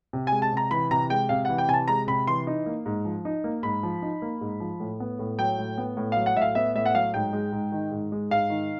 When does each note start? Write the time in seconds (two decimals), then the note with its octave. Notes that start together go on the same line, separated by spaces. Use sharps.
0.13 C3
0.27 G#3 G#5
0.42 A5
0.52 C3 A#5
0.71 E3 B5
0.91 C3 A#5
1.10 G#3 G5
1.29 C3 F5
1.45 E3 F#5
1.58 G5
1.68 C3 G#5
1.73 A5
1.88 G#3 A#5
2.07 C3 B5
2.27 E3 C6
2.47 D#4
2.66 A#3
2.86 G#2
3.05 F3
3.25 D#4
3.44 A#3
3.63 G#2 B5
3.83 F3
4.02 D#4
4.22 A#3
4.41 G#2
4.60 F3
4.80 A2
5.00 B3
5.19 A2
5.38 F#3 G5
5.58 A2
5.78 B3
5.97 A2
6.12 F#3 F5
6.26 F#5
6.35 A2 E5
6.42 F5
6.55 B3 E5
6.75 A2 E5
6.85 F#5
6.95 F#3 F5
7.14 G#2 G5
7.33 G#3
7.52 G#2
7.72 D#3
7.91 G#2
8.12 G#3
8.30 G#2 F5
8.50 D#3